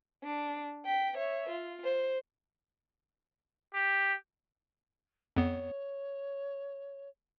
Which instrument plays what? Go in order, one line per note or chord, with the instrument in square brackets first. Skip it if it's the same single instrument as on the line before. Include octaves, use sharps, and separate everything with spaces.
[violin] D4
G5 B6
C#5 E5
F4
C5
[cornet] G4
[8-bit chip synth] F2 B3 [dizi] C#5